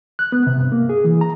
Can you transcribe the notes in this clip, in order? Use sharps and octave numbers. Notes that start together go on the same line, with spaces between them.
F#6
B3
C3
G2
A#3
G#4
E3
A#5